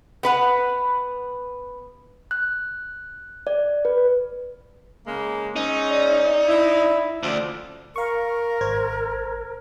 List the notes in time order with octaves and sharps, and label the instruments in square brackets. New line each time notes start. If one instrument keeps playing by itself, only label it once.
[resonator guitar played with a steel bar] B3 B4 F#5
[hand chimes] F#6
D5
B4
[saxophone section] C#3 G#3 A#3
[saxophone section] G#3 C4 C#4 [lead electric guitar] D#4
[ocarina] D5
[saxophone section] E4
[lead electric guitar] D2 [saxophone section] F3 C5 D5 [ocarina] C#4
[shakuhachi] A#4 [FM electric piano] F5 C#6
[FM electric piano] G#1 C5 G#6